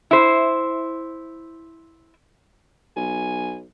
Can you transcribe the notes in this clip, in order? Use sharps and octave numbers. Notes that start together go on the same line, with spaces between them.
E4 C5
B1 G#5